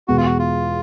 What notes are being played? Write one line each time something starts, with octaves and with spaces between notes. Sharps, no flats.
E2 B2 G#3 F#4
F4
F#4
F4